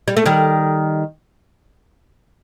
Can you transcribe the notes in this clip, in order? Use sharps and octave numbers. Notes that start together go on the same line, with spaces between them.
G3
A3
D#3 G3